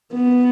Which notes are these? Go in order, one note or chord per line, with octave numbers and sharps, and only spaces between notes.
B3